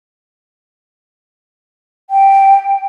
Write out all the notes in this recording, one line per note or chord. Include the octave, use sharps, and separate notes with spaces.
G5